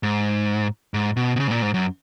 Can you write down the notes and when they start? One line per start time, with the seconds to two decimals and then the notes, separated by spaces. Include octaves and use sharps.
0.03 G#2
0.94 G#2
1.17 B2
1.36 B2
1.40 C#3
1.47 G#2
1.51 A#2
1.62 G#2
1.74 F#2